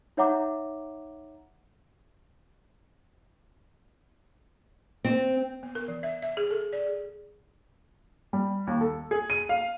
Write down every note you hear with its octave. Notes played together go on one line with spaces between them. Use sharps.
D#4 C#5 E5 F#5 A#5 D6
C4
B3
A#4
E3
E5
E5
G#4
A4
D5
G#4
G3
D#2
A4
G#4
D#7
F5